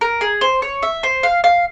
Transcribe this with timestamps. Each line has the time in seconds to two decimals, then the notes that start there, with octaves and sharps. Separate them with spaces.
0.01 A#4
0.21 G#4
0.41 C5
0.62 C#5
0.83 E5
1.03 C5
1.23 F5
1.44 F5